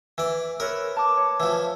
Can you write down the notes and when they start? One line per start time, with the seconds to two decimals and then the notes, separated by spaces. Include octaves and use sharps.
0.18 E3 D5
0.60 A#4 B4 C#5 E6
0.96 A5 D6
1.17 C#5
1.40 E3 F3